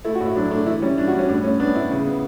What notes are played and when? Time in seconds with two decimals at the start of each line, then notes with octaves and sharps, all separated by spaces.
0.05 A3 E4
0.15 F#4
0.20 A2
0.25 E4
0.36 F#3 D4
0.51 A3 D4
0.66 E3 E4
0.82 G3 C#4
0.98 E3 D4
1.08 F#4
1.13 G3
1.19 C#4
1.28 A2 D4
1.44 A2 C#4
1.60 B3 D4
1.75 A2 E4
1.90 C#3
2.06 B3